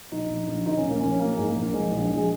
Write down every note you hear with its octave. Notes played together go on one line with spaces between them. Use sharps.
A#1 D#4
A#1
A#1
D#3 D#4
C#4
A#1
A#3
A#1 C#4
F#3 A#3
G#2 G#3
A#3
A#1
A#1 G#3
A#1
A#1
G#4